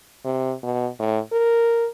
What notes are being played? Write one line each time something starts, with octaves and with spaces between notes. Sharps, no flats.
C3
B2
A2
A#4